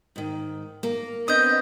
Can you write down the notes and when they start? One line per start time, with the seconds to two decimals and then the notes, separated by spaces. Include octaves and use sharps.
0.16 G#2 D#3
0.83 A#3
1.28 B3 C4 D4 D#5 D#6 G6